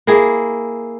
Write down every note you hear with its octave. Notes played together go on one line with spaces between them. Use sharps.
A#3 E4 G#4